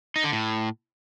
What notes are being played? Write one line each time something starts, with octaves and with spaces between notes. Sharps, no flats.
D#4
D3
A2